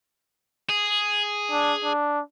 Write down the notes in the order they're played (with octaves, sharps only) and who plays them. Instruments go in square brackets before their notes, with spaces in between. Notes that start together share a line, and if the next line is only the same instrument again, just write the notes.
[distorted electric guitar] G#4
[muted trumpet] D4
D4